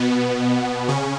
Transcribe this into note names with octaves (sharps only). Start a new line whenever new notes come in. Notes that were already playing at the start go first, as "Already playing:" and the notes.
Already playing: B2 B3
C#3 C#4